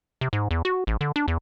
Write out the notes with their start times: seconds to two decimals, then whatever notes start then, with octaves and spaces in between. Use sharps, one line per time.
0.21 C3
0.33 G#2
0.51 E2
0.65 F#4
0.87 A1
1.01 D3
1.16 D4
1.28 E2